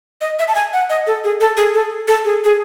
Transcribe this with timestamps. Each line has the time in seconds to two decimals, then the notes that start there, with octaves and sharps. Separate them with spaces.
0.21 D#5
0.39 E5
0.48 A5
0.55 G#5
0.73 F#5
0.90 D#5
1.07 A4
1.24 G#4
1.41 A4
1.57 G#4
1.74 A4
2.08 A4
2.25 G#4
2.44 G#4